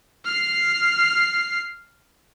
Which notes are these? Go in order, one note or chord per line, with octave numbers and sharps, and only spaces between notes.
F6 C7